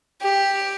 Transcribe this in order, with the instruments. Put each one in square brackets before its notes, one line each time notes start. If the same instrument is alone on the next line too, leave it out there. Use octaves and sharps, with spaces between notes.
[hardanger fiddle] G4